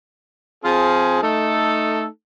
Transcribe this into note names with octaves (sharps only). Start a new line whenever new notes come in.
F3 C4 F4 G#4
A3 D#4 A4